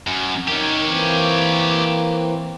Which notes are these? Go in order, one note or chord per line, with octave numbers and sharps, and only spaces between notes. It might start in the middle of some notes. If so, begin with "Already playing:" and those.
F#2
D#4 G4 A#4 C#5
E3 A#3 C4